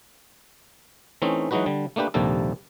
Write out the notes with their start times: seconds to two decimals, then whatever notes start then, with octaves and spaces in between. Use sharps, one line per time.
1.22 E3 A3 C4 C#4 D#4
1.51 E3 F#3 G#3 D#4 F#4 B4
1.66 D3 G3
1.96 A3 A#3 D4 G4 B4
2.14 A#1 D#2 C3 G3 A#3 A4